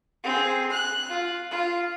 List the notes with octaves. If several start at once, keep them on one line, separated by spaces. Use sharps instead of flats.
C4 G#4
F#6
F4
F4